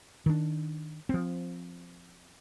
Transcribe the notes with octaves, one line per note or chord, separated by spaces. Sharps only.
D#3 D4
F3 C4